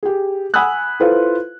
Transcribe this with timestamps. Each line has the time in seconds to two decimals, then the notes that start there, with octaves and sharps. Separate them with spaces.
0.03 G4 G#4
0.54 F#5 G#5 B5 D#6 E6 F#6
1.00 E4 F4 A4 B4 C5 F5